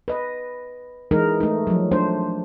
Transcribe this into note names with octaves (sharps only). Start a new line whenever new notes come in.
B4 D#5
E3 G#3 D#4 A#4
A3 D#4
F3 F#3
A3 D4 C5